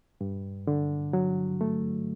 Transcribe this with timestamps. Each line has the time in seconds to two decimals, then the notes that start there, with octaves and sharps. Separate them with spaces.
0.21 G2
0.67 D3
1.13 F#3
1.61 A3